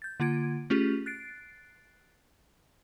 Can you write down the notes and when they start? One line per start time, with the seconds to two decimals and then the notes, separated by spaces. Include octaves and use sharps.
0.02 G6 A6
0.20 D3 A#3 F4 G#6 D7
0.70 A3 C#4 F4 G4 G#4
1.06 F#6 A6 C7 D7